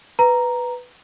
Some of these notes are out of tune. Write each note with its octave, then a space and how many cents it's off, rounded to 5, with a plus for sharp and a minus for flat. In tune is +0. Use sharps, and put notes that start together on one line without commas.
B4 +5 A#5 +0